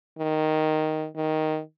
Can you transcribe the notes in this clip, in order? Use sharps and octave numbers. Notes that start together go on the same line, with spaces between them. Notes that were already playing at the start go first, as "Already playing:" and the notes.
D#3
D#3